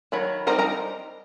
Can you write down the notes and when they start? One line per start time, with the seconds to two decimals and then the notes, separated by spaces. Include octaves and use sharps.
0.12 D#3 F#3 B5
0.47 G3 C4 D#4 A#4 A#5
0.59 A#4 A#5